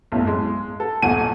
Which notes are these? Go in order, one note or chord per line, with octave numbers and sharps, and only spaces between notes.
B1 F#2 A2
G#3
A4
D#1 B1 F#5 G#5 D#7